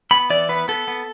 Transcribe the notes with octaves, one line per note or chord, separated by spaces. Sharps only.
B3 B5
E3 D5
B3 B4
B3 A4
B3